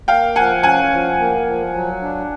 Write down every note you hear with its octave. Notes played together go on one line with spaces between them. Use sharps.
A#3 F5 G5
F3 F#5 G#5
C#4 F#5 G#5
F3
A#3
F3
F#3
D4